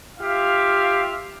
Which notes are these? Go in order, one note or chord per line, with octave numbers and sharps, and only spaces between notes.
F4 G4 E5 F5